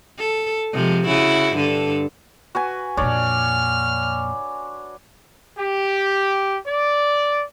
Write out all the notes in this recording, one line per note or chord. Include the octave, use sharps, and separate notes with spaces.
A4
C3 F3 G#3
C#3 E4 F#4
G2 D3 A4
F#4 B4 G#5
F2 A#2 D4 C#5 D5 F6
G4
D5